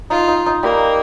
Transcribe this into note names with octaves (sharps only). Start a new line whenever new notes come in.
D#4 F4
D#4
D#4
G3 A#3 G4